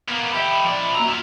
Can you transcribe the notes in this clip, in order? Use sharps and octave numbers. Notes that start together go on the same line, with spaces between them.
A#3 B3
G4 A4 D#5 E5 B5
F3 D5
F#2 A#3 F#4 A#5 E6
E4 F4